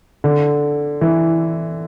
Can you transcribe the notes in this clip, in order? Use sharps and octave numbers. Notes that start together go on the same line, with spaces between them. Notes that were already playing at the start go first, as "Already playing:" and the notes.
D3
E3